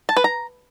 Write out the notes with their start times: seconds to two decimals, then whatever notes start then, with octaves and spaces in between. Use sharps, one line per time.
0.09 A5
0.17 B4
0.24 A#5